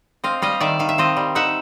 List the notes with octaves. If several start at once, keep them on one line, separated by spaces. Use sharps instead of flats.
C4 D#5 F5
G3 D#5 F5
D#3 D5 E5
D#3 F5
E5
C4 D#5 F5
G3
D#4 E5 F#5